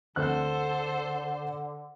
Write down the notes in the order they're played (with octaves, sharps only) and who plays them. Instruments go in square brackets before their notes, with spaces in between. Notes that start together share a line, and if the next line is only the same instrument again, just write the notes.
[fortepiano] D2 C4 F#6 [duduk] D3 [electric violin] A4 C5